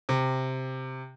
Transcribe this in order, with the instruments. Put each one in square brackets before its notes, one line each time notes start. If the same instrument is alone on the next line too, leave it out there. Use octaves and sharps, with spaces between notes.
[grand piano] C3